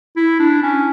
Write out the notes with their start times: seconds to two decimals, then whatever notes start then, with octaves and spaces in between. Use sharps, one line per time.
0.16 E4
0.39 D4
0.62 C#4